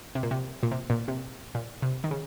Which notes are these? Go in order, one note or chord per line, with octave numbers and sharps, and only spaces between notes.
C3
A#2
C3
A#2
C3
A#2
C3
A#2
C3
D#3
C#3